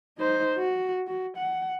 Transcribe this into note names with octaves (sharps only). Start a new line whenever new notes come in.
D#4 C5
F#4
F#4
F#5